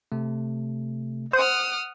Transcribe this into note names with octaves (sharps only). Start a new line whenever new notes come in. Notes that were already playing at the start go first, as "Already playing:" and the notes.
C3 A3
C5 F#5 D#6 F6